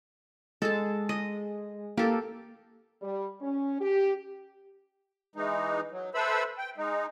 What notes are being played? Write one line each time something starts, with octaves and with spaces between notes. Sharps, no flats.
G#3 A4 A5
D#5
A#3 G4 A4
G3
C#4
G4
E3 G#3 D#4
F#3
A4 B4 C5 E5 B5 E6
G5
G#3 D#4